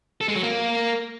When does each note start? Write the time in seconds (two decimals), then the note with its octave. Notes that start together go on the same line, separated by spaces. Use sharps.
0.21 A4
0.28 G#3
0.36 F#3
0.43 A#3